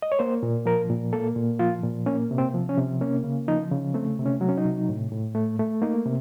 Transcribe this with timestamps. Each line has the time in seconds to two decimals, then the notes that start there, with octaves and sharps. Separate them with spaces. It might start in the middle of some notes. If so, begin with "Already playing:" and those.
0.02 D#5
0.12 C#5
0.19 A#3 C5
0.43 A#2
0.66 F3 A#4
0.90 A#2
1.13 A#3 A4
1.36 A#2
1.59 F3 F4
1.83 A#2
2.06 A#3 C#4
2.31 C3
2.38 C4
2.54 F3
2.69 C#4
2.78 C3
3.01 A#3 C#4
3.24 C#3
3.48 F3 D#4
3.71 C#3
3.94 A3 C4
4.19 C3
4.26 C#4
4.41 F#3
4.49 C#4
4.57 D#4
4.65 C3
4.89 A2
5.12 A2
5.35 A3
5.59 A3
5.82 A#3 D#4
6.06 C3